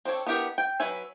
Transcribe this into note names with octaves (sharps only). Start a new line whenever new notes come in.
C4 D4 A4 C#5
B3 D4 E4 G4 A#4
G5
F#3 B4 E5 G#5